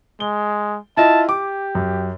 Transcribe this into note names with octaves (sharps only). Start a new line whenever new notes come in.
G#3 G7
E4 F4 D#5 A5
G4 D6
F#2